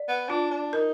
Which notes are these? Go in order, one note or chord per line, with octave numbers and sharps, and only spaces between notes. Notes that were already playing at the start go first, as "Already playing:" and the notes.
Already playing: D5
B3
D4 F4
D4
D#4 A#4